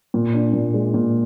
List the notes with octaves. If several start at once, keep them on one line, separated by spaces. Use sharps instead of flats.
A#2
D4
A#2
G#3
A#2